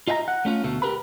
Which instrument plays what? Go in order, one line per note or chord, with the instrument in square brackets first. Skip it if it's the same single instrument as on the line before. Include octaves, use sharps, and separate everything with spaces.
[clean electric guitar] F4 D#5 E5 G5 A#5
F#5
A3 C#4 F4
D2 B2 A3
G4 G#4 A#4 B4 B5